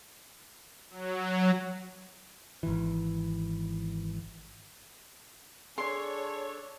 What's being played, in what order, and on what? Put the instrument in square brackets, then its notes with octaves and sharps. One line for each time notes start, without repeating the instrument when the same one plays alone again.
[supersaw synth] F#3
[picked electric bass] G#1 E3
[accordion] D4 A4 [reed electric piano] G#4 D5 [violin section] C#5 [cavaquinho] C6